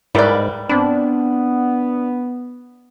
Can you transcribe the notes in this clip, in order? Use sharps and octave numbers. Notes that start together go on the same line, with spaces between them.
G#2 G3 E4 A#4 B4 D5
B3 C4 D4 B5